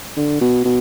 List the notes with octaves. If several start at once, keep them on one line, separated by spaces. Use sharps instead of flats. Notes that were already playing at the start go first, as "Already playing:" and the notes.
D3
B2
B2